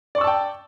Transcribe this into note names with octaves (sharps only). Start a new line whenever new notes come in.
D5 G5 A5 C#6 E6